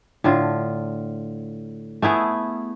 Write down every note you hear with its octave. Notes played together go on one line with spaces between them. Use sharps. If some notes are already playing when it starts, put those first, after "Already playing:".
A2 D3 F4
A3 B3 E4 G#4